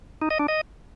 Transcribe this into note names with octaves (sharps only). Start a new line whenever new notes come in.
D#4
D#5
D4
D#5